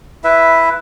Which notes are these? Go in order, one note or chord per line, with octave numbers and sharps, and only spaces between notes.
E4 B4 E5